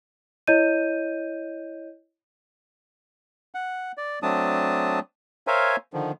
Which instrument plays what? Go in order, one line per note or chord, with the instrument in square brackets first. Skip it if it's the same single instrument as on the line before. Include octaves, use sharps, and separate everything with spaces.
[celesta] E4 C#5 D#5 G6 D#7
[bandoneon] F#5
D5
F#3 A3 C4 D4 A5 D#6
A#4 C5 C#5 E5 F5 G#5
D3 D#3 F3